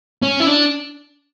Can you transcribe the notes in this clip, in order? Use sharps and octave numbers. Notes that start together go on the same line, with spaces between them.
C#4
E4
D4